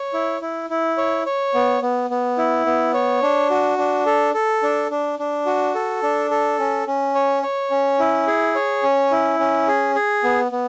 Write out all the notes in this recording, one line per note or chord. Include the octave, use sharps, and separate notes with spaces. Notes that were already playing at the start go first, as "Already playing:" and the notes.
Already playing: C#5
E4
E4
E4
C#5
C#5
B3
B3
B3
E4
B3
C#5
D4
F#4
D4
A4
A4
D4
D4
D4
F#4
A4
D4
A4
C#4
C#4
C#5
C#5
C#4
E4
G#4
C#5
C#4
E4
C#4
G#4
G#4
B3
B3